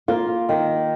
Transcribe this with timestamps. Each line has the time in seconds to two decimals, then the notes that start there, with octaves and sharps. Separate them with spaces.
0.08 A#3 F4
0.49 D#3